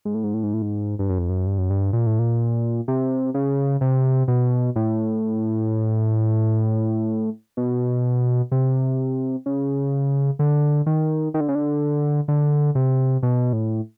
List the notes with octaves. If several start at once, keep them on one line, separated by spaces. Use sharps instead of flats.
G#2
A2
G#2
A2
G#2
A2
G#2
G2
F#2
F2
F#2
G2
F#2
G2
A#2
A2
A#2
C3
C#3
C3
B2
A2
B2
C3
C#3
D3
D#3
D#3
D3
C#3
D3
D3
C3
B2
A2